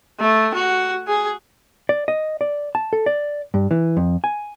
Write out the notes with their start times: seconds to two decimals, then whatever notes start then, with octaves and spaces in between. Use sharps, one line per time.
0.20 A3
0.54 F#4
1.08 G#4
1.89 D5
2.08 D#5
2.41 D5
2.75 A5
2.93 A4
3.06 D5
3.54 G2
3.71 E3
3.97 F2
4.24 G#5